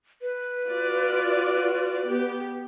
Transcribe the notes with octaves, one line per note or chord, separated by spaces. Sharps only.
B4
F4 F#4 D5
B3 G4